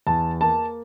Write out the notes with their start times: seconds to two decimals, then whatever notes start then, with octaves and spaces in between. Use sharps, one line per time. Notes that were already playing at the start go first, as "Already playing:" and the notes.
0.07 E2 A5
0.41 A#3 A5